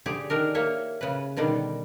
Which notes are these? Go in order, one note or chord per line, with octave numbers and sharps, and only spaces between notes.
D3 G4 G#4
D#3 D4 A#4
A#3 C#5 E5
C#3 B4
B2 D3 D#3 G3